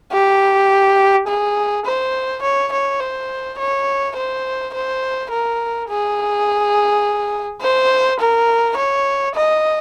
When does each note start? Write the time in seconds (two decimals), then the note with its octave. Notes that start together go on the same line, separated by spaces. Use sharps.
0.12 G4
1.27 G#4
1.86 C5
2.42 C#5
2.72 C#5
3.00 C5
3.59 C#5
4.16 C5
4.74 C5
5.31 A#4
5.88 G#4
7.61 C5
8.19 A#4
8.77 C#5
9.35 D#5